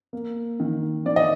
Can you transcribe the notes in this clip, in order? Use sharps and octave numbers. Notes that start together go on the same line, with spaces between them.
A#3
D#3
D#3 D5
D#5